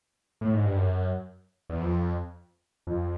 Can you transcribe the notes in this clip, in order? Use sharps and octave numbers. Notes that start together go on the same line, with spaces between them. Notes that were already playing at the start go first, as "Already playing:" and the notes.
A2
G#2
G2
F#2
E2
F2
F2